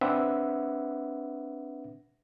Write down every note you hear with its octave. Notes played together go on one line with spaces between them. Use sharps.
C4 D4 B4 E5 F#5